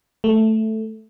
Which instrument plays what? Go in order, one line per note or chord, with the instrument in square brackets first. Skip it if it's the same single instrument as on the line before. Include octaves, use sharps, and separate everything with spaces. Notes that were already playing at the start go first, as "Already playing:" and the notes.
[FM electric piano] A3